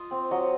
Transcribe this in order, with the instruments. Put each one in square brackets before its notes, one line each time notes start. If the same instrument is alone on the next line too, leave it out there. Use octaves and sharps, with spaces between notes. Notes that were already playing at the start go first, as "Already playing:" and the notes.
Already playing: [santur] F4 D#5
C4
F#3 D#5